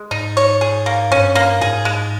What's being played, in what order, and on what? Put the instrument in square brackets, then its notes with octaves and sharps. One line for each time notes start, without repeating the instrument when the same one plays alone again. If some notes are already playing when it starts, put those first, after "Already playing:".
Already playing: [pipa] G#3
[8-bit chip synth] G#2 [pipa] D#4
[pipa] C#5
G#4
A#3
[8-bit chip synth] G2 [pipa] C#4
[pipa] A#3
[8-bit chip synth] G#2 [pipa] G#4
[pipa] G#3